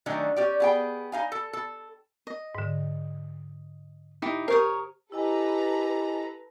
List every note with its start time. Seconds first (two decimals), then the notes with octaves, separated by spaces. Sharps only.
0.06 D#3 F#3 A3 C#4 D4
0.36 C#4 G4 D5
0.60 B3 G#4 G5
1.12 D#4 F5 G#5
1.32 A4
1.53 A4
2.27 D#5
2.55 G#2 D3
4.22 D#4 E4 G4
4.48 G4 A#4 C5 C#5 D#6
5.12 E4 G4 A4 B4 D#5 G#5 A#5